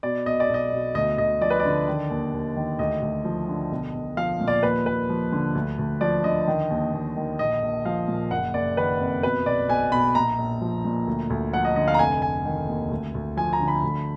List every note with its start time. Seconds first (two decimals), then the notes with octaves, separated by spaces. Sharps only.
0.03 B2 D5
0.26 B1 D#5
0.40 D5
0.49 B1 D#5
0.72 B2
0.95 D2 D#5
1.18 D2 D#5
1.41 F3 D5
1.50 B4
1.60 D5
1.65 D3
1.88 D#3
2.10 D#2
2.33 D#2
2.56 D#3
2.79 D2 D#5
3.02 D2
3.25 F3
3.48 D3
3.71 B1
3.94 B1
4.17 F3 F5
4.40 A#2
4.48 D5
4.63 D#2 B4
4.86 D#2 B4
5.09 F3
5.32 D3
5.55 D2
5.79 D2
6.01 F3 D5
6.24 D3 D#5
6.47 D#3
6.70 D#2
6.93 D#2
7.16 D#3
7.39 A#1 D#5
7.62 A#1
7.85 F3 F5
8.08 A#2
8.31 F#1 F#5
8.54 F#1 D5
8.77 D#3 B4
9.00 F2
9.23 B2 B4
9.46 B1 D5
9.69 B1 G#5
9.92 B2 B5
10.15 A#1 A#5
10.38 A#1
10.61 F3
10.85 A#2
11.07 D2
11.30 D2
11.53 F3 F#5
11.65 D#5
11.76 D3 D#5
11.88 F5
11.94 A#5
11.99 F1 G#5
12.22 F1 G#5
12.45 D#3
12.68 D#2
12.91 D2
13.14 D2
13.37 F3 G#5
13.53 A#5
13.60 D3
13.68 B5
13.83 D2